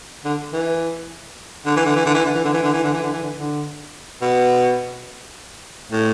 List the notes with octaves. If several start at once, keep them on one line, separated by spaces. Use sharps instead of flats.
D3
E3
D3
E3
D3
E3
D3
E3
D3
E3
D3
E3
D3
E3
D3
E3
D3
E3
D3
D3
B2
A2